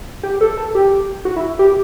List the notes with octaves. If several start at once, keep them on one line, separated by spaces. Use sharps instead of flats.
G4
A4
A4
G4
F#4
E4
G4